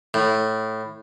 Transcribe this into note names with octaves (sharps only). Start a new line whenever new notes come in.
A2